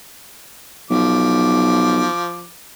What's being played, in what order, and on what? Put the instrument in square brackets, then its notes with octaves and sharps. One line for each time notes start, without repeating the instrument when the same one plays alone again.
[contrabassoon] B1 [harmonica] F3 D6